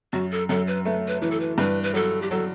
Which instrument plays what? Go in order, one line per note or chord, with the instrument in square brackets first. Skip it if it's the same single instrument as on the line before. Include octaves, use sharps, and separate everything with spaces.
[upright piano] F#2 [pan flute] F#4
[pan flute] A4
[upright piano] F#2 [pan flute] A4
[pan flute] B4
[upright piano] A3 [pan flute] B4
[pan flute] B4
[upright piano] E3 [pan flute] B4
[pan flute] A4
B4
[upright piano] G2 [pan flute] B4
[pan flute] B4
[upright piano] F#3 [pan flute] A4
[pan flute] G4
[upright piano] F#3 [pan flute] A4